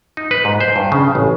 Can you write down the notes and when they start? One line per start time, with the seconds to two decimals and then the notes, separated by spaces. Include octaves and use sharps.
0.17 D#4
0.31 B4
0.45 G#2
0.60 C5
0.76 G2
0.92 C#3
1.15 A1